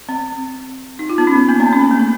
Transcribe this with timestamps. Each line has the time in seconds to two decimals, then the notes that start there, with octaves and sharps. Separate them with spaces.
0.09 C4
0.99 D#4
1.09 F4
1.18 B3
1.27 C#4
1.35 B3
1.49 A#3
1.60 C4
1.73 C#4
1.81 A#3
1.91 A3
1.99 A#3